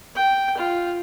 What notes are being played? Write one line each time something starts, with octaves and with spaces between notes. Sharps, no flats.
G5
F4